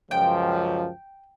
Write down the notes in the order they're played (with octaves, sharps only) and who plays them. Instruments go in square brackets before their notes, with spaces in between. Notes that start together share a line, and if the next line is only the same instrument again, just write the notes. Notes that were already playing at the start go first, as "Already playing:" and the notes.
[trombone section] C#2 F#2 F3 [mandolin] G5